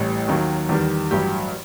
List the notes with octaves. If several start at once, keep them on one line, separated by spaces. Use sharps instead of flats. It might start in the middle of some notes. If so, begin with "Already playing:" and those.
Already playing: A1 A2 E3 G3
D#2 D#3 F#3
E2 D#3 G3
A1 G2 F#3 G4